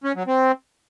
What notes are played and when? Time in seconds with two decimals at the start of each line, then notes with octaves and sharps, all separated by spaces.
0.04 C#4
0.16 F#3
0.27 C4